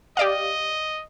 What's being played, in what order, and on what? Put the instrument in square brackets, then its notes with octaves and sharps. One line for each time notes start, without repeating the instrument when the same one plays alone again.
[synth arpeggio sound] G4 D5 F5 [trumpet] D#5